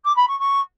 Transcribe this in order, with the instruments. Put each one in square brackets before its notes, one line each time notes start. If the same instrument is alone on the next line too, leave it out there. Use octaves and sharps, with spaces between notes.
[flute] D6
B5
C#6
C#6